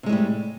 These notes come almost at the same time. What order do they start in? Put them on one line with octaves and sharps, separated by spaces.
C3 G#3 A2 G3